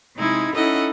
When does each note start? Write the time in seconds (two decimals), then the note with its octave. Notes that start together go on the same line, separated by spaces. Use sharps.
0.16 C3 G#3 D#4 E4 G#6
0.54 C#4 D#4 E4 A4 D#5 F#5